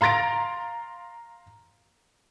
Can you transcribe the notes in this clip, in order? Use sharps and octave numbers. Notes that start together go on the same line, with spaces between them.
F5 A#5 C6 A6 A#6 D7